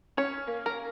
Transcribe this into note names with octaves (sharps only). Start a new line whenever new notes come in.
C#4 C#5
A#3
A#4